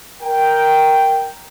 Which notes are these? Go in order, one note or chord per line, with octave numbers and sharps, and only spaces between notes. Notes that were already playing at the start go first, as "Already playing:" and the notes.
A#4 G5